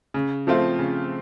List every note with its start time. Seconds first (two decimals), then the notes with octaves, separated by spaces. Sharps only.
0.14 C#3
0.47 F3 A3 C4 F4
0.79 C#3